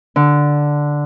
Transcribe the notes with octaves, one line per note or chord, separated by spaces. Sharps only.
D3